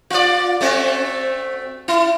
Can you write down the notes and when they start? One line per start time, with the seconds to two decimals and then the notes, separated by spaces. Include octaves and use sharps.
0.10 F4 D5
0.61 A3 C4 F#4
1.88 E4